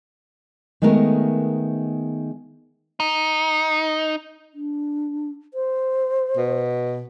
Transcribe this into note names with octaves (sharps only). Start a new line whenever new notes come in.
D#3 G#3 A3 B3 A#4
D#4
D4
C5
B2